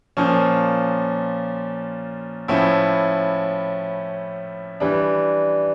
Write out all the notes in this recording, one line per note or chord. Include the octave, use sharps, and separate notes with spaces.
A#2 F3 C#4
A2 F3 C#4 E4
E3 G3 D4